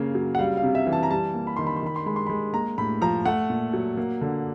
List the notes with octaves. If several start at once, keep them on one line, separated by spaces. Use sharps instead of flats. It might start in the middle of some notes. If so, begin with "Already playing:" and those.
Already playing: C#3 A#3
F#3
F#5
G3 F5
F5
C3
E5
E3
A5
A#5
G3 A5
A#3
B5
D#3 C6
B5
C6
D#3 B5
C6
G#3 B5
C6
G#3 B5
A#3 A#5
A2 B5
F3 A#5
A3 F#5
A#2
F#3
A#3
D3